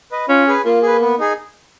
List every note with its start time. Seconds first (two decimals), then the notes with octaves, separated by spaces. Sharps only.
0.12 B4 D#5
0.29 C#4 F4
0.47 G#4 B4
0.65 A#3 F4
0.82 G#4 B4
1.01 B3
1.19 D#4 G#4